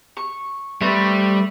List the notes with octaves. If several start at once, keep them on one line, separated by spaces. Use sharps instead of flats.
C#6
G3 A3 C4 B4